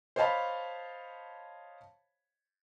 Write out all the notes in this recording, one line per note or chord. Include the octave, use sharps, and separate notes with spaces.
C5 C#5 D#5 F5 A5 B5